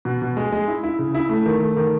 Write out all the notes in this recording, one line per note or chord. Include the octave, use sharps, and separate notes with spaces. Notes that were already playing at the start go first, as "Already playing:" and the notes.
B2
B2
G#3
G#3
E4
E4
C#3
E4
A3
D#3
A3
D#3